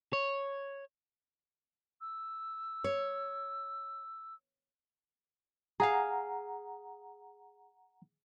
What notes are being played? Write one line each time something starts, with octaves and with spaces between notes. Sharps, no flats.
C#5
E6
C#5
G#4 F5 F#5 A#5